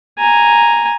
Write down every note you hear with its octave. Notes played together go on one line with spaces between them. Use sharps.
G#5 A#5